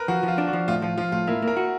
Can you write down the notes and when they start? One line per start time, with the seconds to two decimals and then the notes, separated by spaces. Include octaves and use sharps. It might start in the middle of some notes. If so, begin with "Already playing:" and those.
Already playing: A#4 B4
0.08 F3 F#4
0.23 F3 F4
0.38 D4
0.47 F#4
0.53 F3
0.68 A2 F4
0.82 F3 F4
0.98 F3 F4
1.12 A2 F4
1.27 A#3 E4
1.42 A#3
1.48 A#4
1.57 F#4